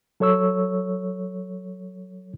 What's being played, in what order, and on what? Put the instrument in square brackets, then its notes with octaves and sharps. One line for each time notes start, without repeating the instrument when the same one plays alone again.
[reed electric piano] F#3 A4 C#5 C#6 E6